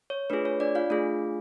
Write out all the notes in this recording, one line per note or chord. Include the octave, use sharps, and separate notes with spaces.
C#5
A3 D4 F4 G#4 B4
C#5
D4 D5
F4 F5
A3 D4 F4 G#4